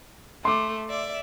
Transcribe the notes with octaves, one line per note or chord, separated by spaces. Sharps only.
A3 C6 D6
D5 E5